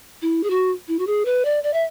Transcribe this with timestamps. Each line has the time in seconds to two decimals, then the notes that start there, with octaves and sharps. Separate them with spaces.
0.22 E4
0.43 G#4
0.50 F#4
0.88 E4
0.99 F#4
1.07 G#4
1.25 B4
1.45 D5
1.64 D5
1.74 E5